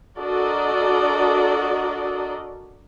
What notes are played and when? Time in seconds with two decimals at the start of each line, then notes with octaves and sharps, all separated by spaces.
0.18 D4 F#4 A4 A#4 D5 D#5